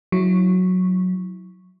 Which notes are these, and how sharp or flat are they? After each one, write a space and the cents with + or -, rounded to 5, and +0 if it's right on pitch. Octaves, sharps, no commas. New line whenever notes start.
F#3 -10 E4 -20